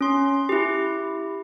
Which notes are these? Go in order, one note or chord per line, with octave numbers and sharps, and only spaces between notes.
C#4 C6
E4 G4